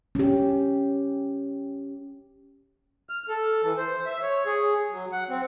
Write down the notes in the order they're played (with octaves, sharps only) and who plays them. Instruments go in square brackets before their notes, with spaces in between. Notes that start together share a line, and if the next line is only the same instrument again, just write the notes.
[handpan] C#4 G4
[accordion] F6
A4
E3
C5
E5
C#5
G#4
F#3
F#5
C4